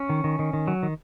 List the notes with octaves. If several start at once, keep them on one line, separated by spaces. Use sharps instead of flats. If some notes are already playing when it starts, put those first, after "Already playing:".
Already playing: C#4
D#3
D#3
D#3
D#3
F#3
D#3